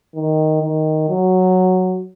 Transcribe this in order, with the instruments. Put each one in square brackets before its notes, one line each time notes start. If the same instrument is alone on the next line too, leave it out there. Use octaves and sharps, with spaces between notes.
[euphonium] D#3
D#3
F#3